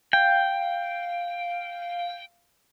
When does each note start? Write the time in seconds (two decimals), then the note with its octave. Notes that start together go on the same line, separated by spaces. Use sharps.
0.13 F5 G5